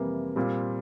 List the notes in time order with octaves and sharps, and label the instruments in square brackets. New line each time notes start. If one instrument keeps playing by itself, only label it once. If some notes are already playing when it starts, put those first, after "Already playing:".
Already playing: [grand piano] F2 C3 E3 G3 A#3
A#2 G3 C4 F4